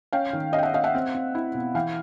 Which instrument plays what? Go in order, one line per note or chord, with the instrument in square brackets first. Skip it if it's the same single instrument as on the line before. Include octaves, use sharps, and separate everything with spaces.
[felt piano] C#4 F5 G5
D#3
C#4 D#5 F5
G5
E5 F#5
C#4 D#5 F5
E5 F#5
C4
C4
E4
B2
E3 F5 G5